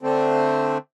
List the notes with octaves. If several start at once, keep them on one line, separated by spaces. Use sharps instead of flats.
D3 A3 C4